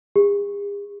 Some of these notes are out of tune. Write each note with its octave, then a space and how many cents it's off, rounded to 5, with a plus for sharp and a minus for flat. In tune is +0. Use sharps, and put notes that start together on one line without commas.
G#4 -45